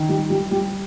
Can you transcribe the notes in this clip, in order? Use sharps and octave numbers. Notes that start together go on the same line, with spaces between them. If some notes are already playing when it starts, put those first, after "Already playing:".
Already playing: D#3
G3
G3
G3